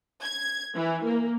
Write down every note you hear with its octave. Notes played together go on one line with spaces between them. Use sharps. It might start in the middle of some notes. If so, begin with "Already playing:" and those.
G#6
E3
A#3